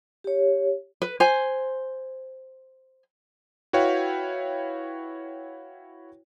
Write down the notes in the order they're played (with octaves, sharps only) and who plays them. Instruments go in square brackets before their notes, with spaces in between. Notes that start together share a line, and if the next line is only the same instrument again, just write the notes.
[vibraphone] G4 C#5
[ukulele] B4
C5 G#5
[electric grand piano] E4 F#4 B4 C#5 F5 G5